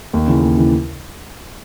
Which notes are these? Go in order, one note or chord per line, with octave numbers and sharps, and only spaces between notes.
D#2
C#3 E3
D#2
C#3 E3